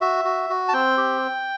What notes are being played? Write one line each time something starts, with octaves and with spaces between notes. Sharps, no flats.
F#4 E5
F#4
F#4
A5
C4 G5
G4